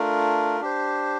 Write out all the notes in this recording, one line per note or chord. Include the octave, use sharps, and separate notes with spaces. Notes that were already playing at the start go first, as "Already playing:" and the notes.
Already playing: A3 D4 F4 A#4
D4 G4 C5